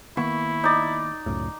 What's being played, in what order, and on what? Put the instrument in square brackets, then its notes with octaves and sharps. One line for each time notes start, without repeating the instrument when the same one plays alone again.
[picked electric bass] D#3 A#3 B3 [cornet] E4 [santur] C#6
[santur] D#4 D5
[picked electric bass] C#2 F#2 A2